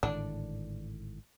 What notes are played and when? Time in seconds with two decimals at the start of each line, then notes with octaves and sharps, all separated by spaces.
0.03 G#1 A2 D3 D4